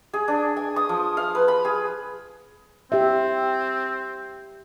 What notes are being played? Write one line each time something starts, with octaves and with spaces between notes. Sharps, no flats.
G#4
D4
G#5
D#6
F3
F5
B4
B5
G#4
C4 G4 E5